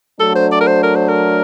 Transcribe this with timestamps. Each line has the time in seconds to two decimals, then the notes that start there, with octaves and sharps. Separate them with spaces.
0.19 F#3 A3 D4 A4
0.35 C5
0.52 D5
0.60 A#4
0.67 C5
0.83 A#4
0.95 C5
1.08 A#4